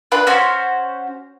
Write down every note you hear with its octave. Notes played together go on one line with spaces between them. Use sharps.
D4 F4 B4
C#4 F#4 C5 C#5